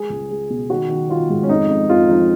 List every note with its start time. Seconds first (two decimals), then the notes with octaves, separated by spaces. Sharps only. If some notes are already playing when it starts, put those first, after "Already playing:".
Already playing: G#3 G#4
0.10 C#2
0.31 G#3
0.50 B2
0.70 D#3 F#4
0.89 D#3
1.09 D#3 F4
1.30 G#2
1.43 C#4
1.49 F2 D#4
1.69 F2
1.89 F2 F4
2.09 F3 D#4